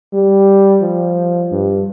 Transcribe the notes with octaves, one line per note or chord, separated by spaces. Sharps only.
G3
F3
G2